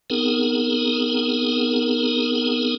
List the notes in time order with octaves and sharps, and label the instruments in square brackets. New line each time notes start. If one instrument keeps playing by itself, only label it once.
[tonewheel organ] B3 C4 D#4 G#4 A#4